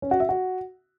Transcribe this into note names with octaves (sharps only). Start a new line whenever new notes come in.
C#4
F#4
E5
F#4